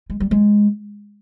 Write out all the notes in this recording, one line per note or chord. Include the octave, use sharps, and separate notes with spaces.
G#3
G3
G#3